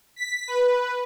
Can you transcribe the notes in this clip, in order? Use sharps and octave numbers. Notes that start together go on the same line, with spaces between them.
B6
B4